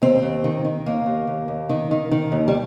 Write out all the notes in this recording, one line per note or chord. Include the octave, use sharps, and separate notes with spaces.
D#2 C4
D#2
D#3
D#3
D#2 A#3
D#2
D#2
D#2
D#3
D#3
D#3
D#2
G3